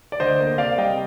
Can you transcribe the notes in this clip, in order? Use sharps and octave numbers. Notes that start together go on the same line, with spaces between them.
D5
D2 C5 D#5
A#3
C3 D5 F5
G3 D#5 G5